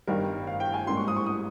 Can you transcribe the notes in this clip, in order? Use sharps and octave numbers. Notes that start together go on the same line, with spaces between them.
G1 G2 D#3 G3 A#4
F5
G5
G#5
G#2 G3 A#3 C#4 C6
C#6
D#6
C#6
D#6